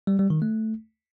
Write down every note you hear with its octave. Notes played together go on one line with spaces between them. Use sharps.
G3
G3
D#3
A3